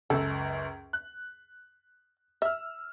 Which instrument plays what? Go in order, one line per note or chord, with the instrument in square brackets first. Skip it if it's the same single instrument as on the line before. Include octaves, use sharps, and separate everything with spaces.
[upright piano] C#2 F#2 [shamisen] A4
[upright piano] F#6
[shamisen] E5 [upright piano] E6 F6